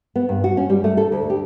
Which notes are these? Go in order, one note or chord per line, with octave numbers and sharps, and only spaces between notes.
B3
G2
F#4
C#4
G3
A3
A4
D2
G4